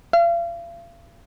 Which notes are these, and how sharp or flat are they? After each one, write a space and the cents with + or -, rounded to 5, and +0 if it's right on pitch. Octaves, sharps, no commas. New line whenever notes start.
F5 -40